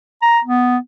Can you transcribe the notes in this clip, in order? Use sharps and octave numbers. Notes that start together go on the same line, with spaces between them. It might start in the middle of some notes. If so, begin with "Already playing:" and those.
A#5
B3